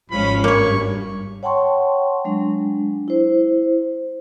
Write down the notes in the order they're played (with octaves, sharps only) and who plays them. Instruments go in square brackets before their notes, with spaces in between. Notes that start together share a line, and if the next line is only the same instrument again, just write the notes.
[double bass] G#1 [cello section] F3 G#3 C#4 [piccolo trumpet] B5
[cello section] G2 [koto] A#3 C#5 [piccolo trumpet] C#6
[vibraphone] C#5 F#5 G5 A5 C6 C#6
F#3 G#3 D4
E4 C5